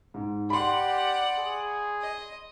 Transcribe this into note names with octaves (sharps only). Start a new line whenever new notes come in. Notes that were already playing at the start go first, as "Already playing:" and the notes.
G#2
G4 D5 F#5 B5 C6
G#4
D#5